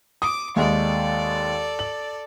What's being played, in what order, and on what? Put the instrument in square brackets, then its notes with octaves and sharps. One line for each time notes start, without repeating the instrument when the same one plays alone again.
[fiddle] D6 [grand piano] D#6
[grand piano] D#2 G#3 [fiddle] A4 D5
[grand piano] F#7